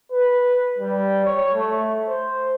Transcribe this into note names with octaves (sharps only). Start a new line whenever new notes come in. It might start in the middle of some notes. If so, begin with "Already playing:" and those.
B4
G3
C#5
A3
C5